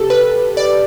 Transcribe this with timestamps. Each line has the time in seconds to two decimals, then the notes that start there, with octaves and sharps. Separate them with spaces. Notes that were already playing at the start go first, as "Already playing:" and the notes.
Already playing: C3 G4 A4
0.10 B4
0.57 D5